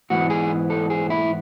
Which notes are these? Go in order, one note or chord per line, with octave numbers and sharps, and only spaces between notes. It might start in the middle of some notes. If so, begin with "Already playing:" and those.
G#2 E3 B3 F#4
G#4
A4
G#4
E4